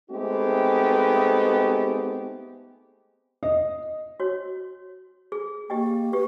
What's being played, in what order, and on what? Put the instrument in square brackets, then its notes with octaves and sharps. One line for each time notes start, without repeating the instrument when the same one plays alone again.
[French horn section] G#3 A3 B3 C4 D#4 G4
[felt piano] D#5
[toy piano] F#4 C#5
G#4
[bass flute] A#3 [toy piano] G4 D#5 G5
[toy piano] G4 [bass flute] B4